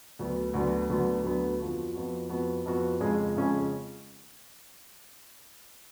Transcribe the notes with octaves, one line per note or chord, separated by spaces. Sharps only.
D2 D3 F#3 B3
D2 D3 F#3 B3
D2 D3 F#3 B3
D2 D3 F#3 B3
F2 F3 B3 F#4
F2 F3 B3 F#4
F2 F3 B3 F#4
F2 F3 B3 F#4
F2 C#3 G#3 C#4 G#4
F2 C#3 G#3 C#4 G#4